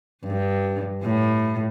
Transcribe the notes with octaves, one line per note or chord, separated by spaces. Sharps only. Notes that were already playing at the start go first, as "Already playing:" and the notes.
G2
A2